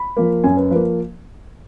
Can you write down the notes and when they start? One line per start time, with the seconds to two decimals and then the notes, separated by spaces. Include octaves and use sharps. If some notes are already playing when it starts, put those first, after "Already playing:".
Already playing: B5
0.17 F3 A#3
0.44 F#2 G#5
0.57 B4
0.71 F3 A#3 B4